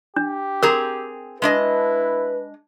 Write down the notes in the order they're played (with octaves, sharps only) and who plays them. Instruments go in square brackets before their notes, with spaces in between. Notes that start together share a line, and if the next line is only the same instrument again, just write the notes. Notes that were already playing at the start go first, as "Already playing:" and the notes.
[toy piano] D4 [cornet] G4
[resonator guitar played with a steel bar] C4 G#4 A#5 [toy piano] A#4
[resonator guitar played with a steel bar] G#3 D4 D#5 [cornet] E4 [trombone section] B4